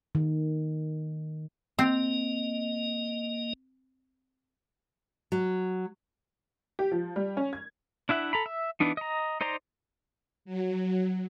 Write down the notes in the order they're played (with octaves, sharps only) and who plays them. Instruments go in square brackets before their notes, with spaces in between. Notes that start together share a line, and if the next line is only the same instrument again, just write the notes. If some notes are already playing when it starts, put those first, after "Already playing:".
[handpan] D#3
[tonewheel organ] A#3 D#5 [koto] C4
[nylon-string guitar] F#3
[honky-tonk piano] G4
F3
G3
C#4
G#6
[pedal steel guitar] D4 E4 E5 F#5
A4 A#5 B5
E5
E3 B3 D4 D#4
D#5 A#5
D#4 C5 D5 A#5 C6
[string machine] F#3